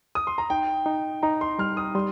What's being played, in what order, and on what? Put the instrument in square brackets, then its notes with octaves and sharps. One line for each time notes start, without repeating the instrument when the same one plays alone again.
[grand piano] D#6
C6
A#5
[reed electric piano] D#4 [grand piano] G5
[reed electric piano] D#4
[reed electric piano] D#4 [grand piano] A#5
[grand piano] C6
[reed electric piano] G3 [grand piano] F6
[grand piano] D#6
[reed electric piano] G3 [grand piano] C6